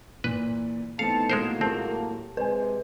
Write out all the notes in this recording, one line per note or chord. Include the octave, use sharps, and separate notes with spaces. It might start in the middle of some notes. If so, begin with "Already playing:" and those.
A#2 E3 B4
E3 A3 B3 C4 D#4 F5 A5 C#7
A2 F#3 G#3 A#3 A#4 C5 E7
G#3 C4 F4 A#4 A5
G4
C3 G#3 B4 C5 G#5